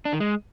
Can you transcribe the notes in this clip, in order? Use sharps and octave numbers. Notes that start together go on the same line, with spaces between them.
D4
D#3
G#3